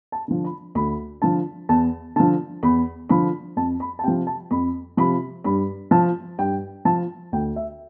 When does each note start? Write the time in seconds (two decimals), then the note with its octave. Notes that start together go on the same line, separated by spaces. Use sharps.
0.12 A5
0.28 D3 F3
0.44 B5
0.75 D2 B5
1.22 D3 F3 A5
1.69 E2 A5
2.16 D3 F3 A5
2.63 E2 B5
3.09 D3 F3 B5
3.57 F2 A5
3.80 B5
3.99 A5
4.03 C3 G5
4.08 F3
4.27 A5
4.51 F2 B5
4.97 C3 F3 B5
5.44 G2 B5
5.91 F3 A5
6.38 G2 G5
6.85 F3 A5
7.32 D2 G5
7.56 E5